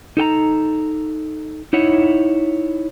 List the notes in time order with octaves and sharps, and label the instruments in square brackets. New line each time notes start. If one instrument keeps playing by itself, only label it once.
[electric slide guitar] D#4 A4 G5 A#5
D#4 E4 C#5 F#5